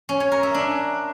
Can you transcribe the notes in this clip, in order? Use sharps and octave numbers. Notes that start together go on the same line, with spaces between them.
C#4
C#5
A#4
E5
D4